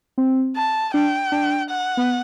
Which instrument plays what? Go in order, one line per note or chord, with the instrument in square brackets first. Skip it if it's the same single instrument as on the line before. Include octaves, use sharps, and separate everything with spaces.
[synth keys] C4
[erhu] A5
[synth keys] D4 [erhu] G5
[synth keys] D4
[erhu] F#5
[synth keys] B3